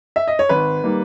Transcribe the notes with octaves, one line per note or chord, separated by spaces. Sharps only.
E5
D#5
C#5
G#1 B4
D#3 G3 A#3